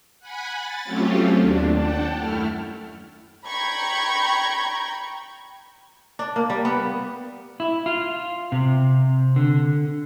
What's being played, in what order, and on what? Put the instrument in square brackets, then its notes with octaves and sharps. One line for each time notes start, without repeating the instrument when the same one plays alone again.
[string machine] F#5 G#5 B5
A6
F#3 A3 C4 C#4 F4 G4
D#2 D4
F#5 G5 A5
F#2 A3 E4 F6
[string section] G5 A#5 B5 C#6 G6 G#6
[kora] D4
A#3
G3
B3
[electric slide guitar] E4
F4
C3
D3